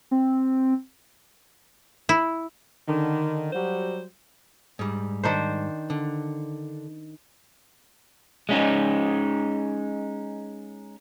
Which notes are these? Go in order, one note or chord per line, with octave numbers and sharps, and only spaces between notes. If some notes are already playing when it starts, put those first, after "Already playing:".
C4
E4
D3 D#3
F#3 G3 F#4 C5
G#2 G3
D#3 D4 C5
D3
G#3 C#4 D#4